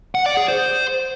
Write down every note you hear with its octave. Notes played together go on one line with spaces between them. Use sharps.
F#5
D5
G#4
C5